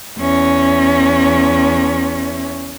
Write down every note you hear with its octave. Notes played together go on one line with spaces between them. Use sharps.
E2 C#4